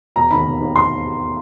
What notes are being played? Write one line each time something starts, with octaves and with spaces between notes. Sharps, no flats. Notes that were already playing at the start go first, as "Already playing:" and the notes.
E1 A#5
D#2 D#3 B5
E1
D#2 D#3
C6